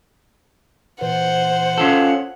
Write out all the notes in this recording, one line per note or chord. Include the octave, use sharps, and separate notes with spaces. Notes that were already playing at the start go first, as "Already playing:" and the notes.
A#2 E3 C5 F#5
C#4 F4 A4